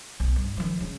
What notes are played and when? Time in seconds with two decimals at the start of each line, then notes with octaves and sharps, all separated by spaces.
0.20 B1
0.36 G2
0.57 D#3 F3
0.80 C#3